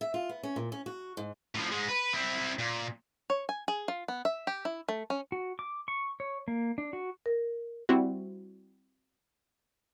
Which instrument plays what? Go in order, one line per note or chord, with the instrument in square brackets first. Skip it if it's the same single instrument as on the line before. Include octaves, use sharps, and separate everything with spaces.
[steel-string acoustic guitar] E5
F4
B3
C#4
A#2
C#4
F#4
G#2
[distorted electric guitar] A2 F3
G#2 G#3
B4
C4 E4
A#2
[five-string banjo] C#5
G#5
G#4
F4
B3
E5
G4
E4
A3
C#4
[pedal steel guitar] F#4
D6
C#6
C#5
A#3
D4
F#4
[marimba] A#4
[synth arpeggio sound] G3 C4 E4 F#4